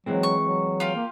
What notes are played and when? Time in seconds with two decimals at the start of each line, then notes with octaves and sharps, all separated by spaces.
0.06 E3 F#3 G#3 C4
0.23 C#6
0.41 F#3
0.80 F4 G4 F5
0.95 A#3